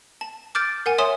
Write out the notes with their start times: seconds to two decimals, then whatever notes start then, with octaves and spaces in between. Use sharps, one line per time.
0.21 A5
0.55 D6 F6 G6 A6 D7
0.86 A#4 F#5 G#5
0.98 C#5 E5 G#5 C6 D#6 E7